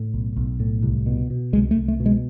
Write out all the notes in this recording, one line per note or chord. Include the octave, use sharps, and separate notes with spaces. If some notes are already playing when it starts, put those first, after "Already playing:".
Already playing: A2
B1
B1
A2
C2
B2
B2
C2 G#3
A3
C2
A3
B2
G#3